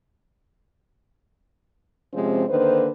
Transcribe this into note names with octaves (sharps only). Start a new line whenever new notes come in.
C3 F3 G#3 C4 C#4 C5
D3 D#3 A#3 B4 C5